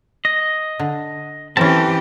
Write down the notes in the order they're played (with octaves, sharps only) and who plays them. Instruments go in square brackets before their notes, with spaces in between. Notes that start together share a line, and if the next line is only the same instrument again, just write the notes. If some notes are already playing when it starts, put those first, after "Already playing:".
[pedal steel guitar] D#5
[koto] D3
[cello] E3 G4 [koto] C4 C#4 [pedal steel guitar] A4 A#4 A5